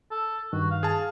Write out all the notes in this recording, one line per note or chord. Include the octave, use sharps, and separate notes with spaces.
A4
G2 D#3 F#4
F5
G#4 A5